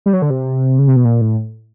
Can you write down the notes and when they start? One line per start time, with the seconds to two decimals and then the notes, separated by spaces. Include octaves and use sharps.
0.06 G3
0.13 F#3
0.22 D3
0.30 C3
0.79 C#3
0.87 C3
0.96 B2
1.05 A#2
1.21 A2